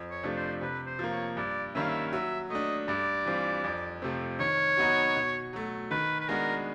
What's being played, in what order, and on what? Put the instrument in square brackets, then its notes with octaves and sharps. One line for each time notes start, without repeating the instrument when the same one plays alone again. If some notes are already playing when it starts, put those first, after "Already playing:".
Already playing: [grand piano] F2
[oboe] C#5
[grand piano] C3 F3 A3 D4
[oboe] C5
[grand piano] C3 [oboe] B4
[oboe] C5
[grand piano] F3 A#3
[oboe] C#5
[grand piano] G2 [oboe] D5
[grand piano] D#3 G3 A#3 C#4 [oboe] E5
[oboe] F5
E5
[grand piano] F#3 [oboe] E5
[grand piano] A3 D4 [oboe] D#5
[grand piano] G2 [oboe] D5
[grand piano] E3 G3 C4 F4
F2
C3 F3 A3 C4
[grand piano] D#3 [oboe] C#5
[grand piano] F#3 B3 D#4 F#4
B2
F#3 A3
[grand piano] D#3 [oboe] B4
[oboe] B4
[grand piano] G#3 B3 D4 F#4 [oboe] A#4